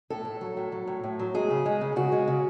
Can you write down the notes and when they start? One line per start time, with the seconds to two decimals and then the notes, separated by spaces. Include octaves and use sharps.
0.10 A2 A4
0.25 A2
0.41 F#3
0.57 A2
0.72 F#3
0.87 A2
1.03 A2
1.19 F#3
1.34 G#3 G#4
1.50 C#3
1.66 G#3
1.81 C#3
1.96 C#3 F#4
2.12 G#3
2.28 C#3